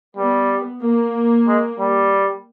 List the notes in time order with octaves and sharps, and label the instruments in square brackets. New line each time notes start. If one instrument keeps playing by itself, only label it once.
[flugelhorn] G3 [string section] B3
[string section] A#3
[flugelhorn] G#3
G3